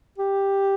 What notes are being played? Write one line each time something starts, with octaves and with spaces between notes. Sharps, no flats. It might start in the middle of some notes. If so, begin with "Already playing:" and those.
G4